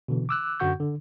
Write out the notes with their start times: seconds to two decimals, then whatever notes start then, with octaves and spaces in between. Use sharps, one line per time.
0.08 B2 D3 E3
0.29 D6 E6 F#6
0.60 F#2 D3 F#4 F#5 C#6 G6
0.80 D3